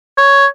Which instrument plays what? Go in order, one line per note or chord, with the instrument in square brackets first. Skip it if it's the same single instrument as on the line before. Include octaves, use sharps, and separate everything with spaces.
[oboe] C#5